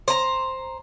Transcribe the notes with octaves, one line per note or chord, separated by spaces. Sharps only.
C5 A#5